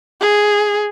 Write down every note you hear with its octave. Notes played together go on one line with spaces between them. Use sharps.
G#4